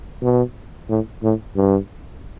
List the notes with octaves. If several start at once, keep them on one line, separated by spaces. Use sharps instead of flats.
B2
A2
A2
G2